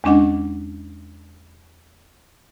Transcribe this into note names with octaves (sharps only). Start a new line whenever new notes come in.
E2 G#3 C#4 D4 D#5 F#5